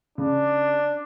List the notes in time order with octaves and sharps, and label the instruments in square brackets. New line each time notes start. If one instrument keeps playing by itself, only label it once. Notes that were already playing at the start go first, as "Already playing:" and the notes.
[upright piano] C#3 [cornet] D4